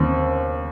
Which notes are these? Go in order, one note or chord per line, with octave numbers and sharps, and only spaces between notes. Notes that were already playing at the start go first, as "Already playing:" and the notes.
Already playing: D#2 C4